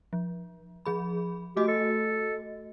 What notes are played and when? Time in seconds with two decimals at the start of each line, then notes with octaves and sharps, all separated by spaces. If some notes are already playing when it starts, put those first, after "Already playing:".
0.13 F3
0.86 F3 G#4 B5
1.57 A3 F#4 G4 D#5
1.68 A4